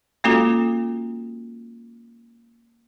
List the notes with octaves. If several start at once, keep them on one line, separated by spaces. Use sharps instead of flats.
G#3 A#3 C#4 F4 F#4 A4